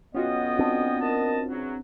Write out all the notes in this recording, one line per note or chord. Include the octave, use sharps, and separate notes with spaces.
B1 B3 C#4 F4 F#4 D#5 G5
C4 D4
A#4 D#5 A5
E2 F#3